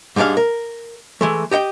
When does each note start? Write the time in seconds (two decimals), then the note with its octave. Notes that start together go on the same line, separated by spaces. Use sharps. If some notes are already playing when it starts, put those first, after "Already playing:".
0.16 G#2 G3 G#3 D4 F5
0.37 A#4
1.21 E3 G#3 A3
1.51 G4 D#5 F#5 G5